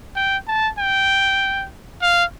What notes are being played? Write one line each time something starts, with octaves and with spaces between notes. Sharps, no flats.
G5
A5
G5
F5